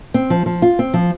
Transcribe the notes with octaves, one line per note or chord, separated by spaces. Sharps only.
C4
F3
F3
F4
C4
F3